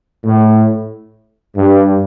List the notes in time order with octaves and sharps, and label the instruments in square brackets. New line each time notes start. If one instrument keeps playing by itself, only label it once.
[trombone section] A2
G2